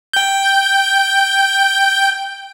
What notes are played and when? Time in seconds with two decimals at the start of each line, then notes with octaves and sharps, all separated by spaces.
0.13 G5 G6